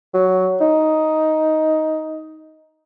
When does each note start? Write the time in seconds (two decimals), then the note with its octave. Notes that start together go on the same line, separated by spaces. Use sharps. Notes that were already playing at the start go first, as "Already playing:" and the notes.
0.14 F#3
0.61 D#4